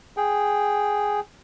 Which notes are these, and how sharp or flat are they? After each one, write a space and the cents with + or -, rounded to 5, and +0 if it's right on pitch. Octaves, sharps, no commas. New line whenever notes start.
G#4 +0 G5 +0